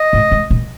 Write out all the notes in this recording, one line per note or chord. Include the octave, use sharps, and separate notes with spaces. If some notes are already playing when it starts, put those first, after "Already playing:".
Already playing: D#5
A2
G#2
A#2